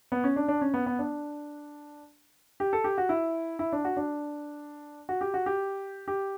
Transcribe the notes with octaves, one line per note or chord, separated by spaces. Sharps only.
B3
C#4
D4
D4
C#4
B3
B3
D4
G4
A4
G4
F#4
E4
E4
D4
F#4
D4
F#4
G4
F#4
G4
G4